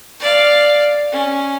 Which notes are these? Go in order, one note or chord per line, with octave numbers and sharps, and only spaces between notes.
D5 F5
C#4